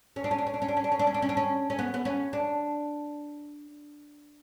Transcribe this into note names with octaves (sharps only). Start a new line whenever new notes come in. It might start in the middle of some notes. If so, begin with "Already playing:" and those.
C#4
D4
C#4
D4
C#4
D4
C#4
D4
C#4
D4
C#4
D4
C#4
D4
C#4
D4
C#4
C#4
B3
B3
C#4
D4